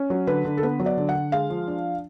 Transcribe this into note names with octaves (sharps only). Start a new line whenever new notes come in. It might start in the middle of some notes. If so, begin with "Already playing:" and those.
Already playing: C#4
F#3
D3 B4
D3
A4
B3 B4
F#3
D5
D3
F#5
D3
G#3 F5
F3
D4